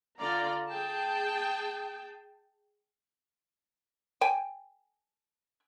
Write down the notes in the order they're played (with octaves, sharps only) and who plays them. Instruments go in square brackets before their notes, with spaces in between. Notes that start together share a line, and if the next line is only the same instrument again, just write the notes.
[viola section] D3 F4 D5 A#5
G#4 G5 A5
[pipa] G5 G#5